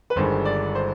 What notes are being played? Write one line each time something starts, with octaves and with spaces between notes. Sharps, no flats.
B4
G1 G2 D#3 G#3 C5
D5
C5